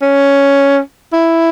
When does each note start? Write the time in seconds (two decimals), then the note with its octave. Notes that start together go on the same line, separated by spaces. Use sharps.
0.01 C#4
1.13 E4